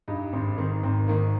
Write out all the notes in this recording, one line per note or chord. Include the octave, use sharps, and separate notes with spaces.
G2 D#4
G#1 C4
D#3 C4
G#1 C4
D#3 A#3